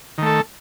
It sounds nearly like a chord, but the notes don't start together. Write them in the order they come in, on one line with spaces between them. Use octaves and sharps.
D#3 A3 A4